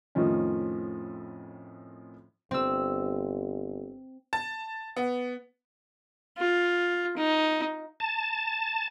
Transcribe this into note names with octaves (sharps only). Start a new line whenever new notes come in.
F2 A2 D#3 F3 C#4
G1 C4 E6
A5
B3
F4
D#4
A5